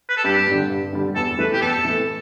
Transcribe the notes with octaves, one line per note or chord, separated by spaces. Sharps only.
B4
A4
G2 G4
D3 G3
G2
D3 G3
E2 A4
E3 A3 B4
G4
E2 A4
E3 A3